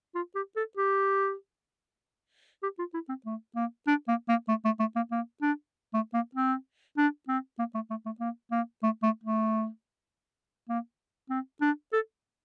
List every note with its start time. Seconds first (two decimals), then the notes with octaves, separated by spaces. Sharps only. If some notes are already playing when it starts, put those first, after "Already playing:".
0.15 F4
0.35 G4
0.56 A4
0.77 G4
2.63 G4
2.79 F4
2.94 E4
3.09 C4
3.25 A3
3.55 A#3
3.87 D4
4.08 A#3
4.28 A#3
4.48 A3
4.65 A3
4.79 A3
4.96 A#3
5.11 A#3
5.42 D4
5.94 A3
6.14 A#3
6.35 C4
6.97 D4
7.28 C4
7.59 A#3
7.75 A3
7.90 A3
8.06 A3
8.20 A#3
8.51 A#3
8.83 A3
9.03 A3
9.24 A3
10.69 A#3
11.30 C4
11.61 D4
11.93 A4